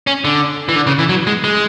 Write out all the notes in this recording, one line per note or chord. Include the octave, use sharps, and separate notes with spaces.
C#4
D3
E3
D3
C#3
E3
F#3
G#3
G#3